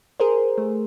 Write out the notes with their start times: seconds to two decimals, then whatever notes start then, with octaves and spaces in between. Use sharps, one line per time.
0.20 G#4 A#4 C5
0.58 A3